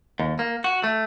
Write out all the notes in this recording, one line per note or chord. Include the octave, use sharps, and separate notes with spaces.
D#2
A#3
F#4
A3